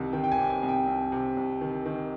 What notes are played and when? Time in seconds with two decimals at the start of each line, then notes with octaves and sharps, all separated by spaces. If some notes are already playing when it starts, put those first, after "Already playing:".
Already playing: C2 C3 D#3
0.13 D#3 G5
0.24 G5
0.32 G#5
0.38 C3
0.50 G#5
0.63 C2
0.69 G5
0.87 C2
1.12 C3
1.37 C2
1.61 D#3
1.86 D#3